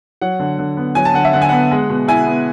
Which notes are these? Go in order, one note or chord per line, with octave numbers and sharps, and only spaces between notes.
F#3 F#5
D3
D3
B3
F#3 G#5
A5
D3 F#5
E5
D3 F#5
G#5
B3 F#5
G#3
B2
E4 G#5
B3